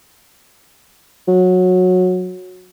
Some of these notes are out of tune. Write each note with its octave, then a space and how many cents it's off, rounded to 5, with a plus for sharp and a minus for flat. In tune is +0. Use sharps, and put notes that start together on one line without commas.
F#3 -15